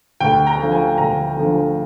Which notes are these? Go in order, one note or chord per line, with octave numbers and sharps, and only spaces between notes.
D2 G5
A#5
D3 F3
G#5
D2 A#5
D3 F3